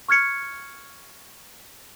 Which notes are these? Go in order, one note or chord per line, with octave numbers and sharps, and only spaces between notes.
C#6 F6 G#6 C#7